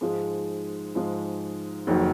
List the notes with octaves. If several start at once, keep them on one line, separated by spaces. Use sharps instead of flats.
G#2 F3 G#3
G#2 F3 G#3
F#1 F2 D#3 F#3